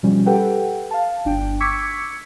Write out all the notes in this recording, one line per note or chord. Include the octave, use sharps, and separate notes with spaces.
B2 F3 G3 C#4
G4 A4 B4 F#5 G5
F5 A5
G1 D4 G5
C#6 D6 E6 G#6 B6 C#7